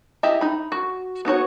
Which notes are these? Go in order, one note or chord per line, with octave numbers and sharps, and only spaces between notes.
E4 G4 G#4 D#5 E5
D#4 B5
F#4
B3 D#4 F#4 C#5